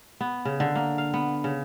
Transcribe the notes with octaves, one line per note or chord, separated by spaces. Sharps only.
B3
C#3
D3
A#3
F5
B3
C#3